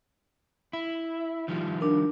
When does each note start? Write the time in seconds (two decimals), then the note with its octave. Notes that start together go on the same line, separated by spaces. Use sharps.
0.73 E4
1.48 D#3 F3 G3
1.81 D4 A#4